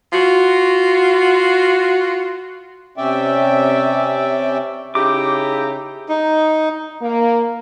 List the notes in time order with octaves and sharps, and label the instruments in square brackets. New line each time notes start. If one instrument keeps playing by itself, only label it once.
[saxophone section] F4 F#4
[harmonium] C3 C#4 D5 E5 G5
[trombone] C#3 [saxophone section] D#4 E4 G4 [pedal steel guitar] D6
[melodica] D#4
[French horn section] A#3